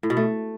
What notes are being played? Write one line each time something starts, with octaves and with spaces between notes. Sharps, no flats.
A2
B2
A3